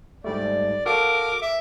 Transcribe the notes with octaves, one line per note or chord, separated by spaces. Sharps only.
G#2 G3 A3 D5
F#4 A4 A#4 F5 D6
E5